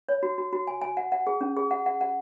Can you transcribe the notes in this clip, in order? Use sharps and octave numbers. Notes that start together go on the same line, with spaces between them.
C#5
F#4
F#4
F#4
G#5
G#5
F#5
F#5
G#4
C#4
G#4
F#5
F#5
F#5